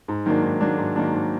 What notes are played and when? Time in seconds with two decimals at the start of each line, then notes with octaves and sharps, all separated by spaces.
0.08 G#2
0.26 D#3 F#3 A#3 D4
0.43 G#2
0.61 D#3 F#3 A#3 D4
0.78 G#2
0.96 D#3 F#3 A#3 D4
1.13 G#2